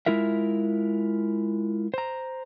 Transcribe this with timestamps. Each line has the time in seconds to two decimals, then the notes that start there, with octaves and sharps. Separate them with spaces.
0.06 G#3 E4 F4 A#4 E5
1.94 C5 A#5